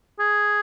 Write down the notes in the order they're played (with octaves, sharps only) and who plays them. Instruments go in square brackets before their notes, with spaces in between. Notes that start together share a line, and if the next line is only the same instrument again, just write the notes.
[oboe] G#4